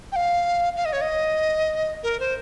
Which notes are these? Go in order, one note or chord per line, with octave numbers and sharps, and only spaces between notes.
G5
F5
F5
D#5
C#5
D#5
A#4
C5